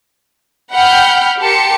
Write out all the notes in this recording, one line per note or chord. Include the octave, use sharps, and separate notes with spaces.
F#5 G5 B5 F6 G6
G4 A#4 G5 A5 C6 C#7